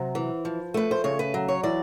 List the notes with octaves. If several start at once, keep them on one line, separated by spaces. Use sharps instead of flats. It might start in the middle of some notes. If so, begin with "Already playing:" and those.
Already playing: C3 F#3 C5
E3
F3
A3 B4
C5
C#3 C#5
B4
F#3
C#5
E3 D5